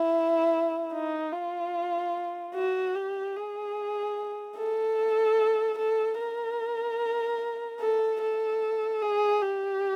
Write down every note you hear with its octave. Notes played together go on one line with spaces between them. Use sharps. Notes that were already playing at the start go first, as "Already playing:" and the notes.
Already playing: E4
D#4
F4
F#4
G4
G#4
A4
A4
A#4
A4
A4
G#4
G4